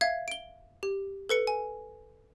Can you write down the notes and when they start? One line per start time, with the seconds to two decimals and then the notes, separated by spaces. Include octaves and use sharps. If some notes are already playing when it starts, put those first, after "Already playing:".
0.01 E5 F5 G#6
0.28 D7 G7
0.83 G4
1.29 A4 B4 C#7
1.47 G#5